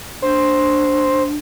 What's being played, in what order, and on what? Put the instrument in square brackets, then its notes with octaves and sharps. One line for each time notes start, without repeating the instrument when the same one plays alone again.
[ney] D4 [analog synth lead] C5